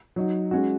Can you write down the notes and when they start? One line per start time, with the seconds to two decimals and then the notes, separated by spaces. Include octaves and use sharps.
0.16 F#3 D#4 F#4
0.51 G#3 C#4 F#4